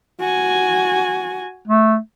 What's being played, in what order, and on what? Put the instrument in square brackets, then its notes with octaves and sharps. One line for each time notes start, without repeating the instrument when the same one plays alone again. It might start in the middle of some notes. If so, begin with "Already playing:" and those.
[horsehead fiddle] F#4 G#5
[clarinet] A3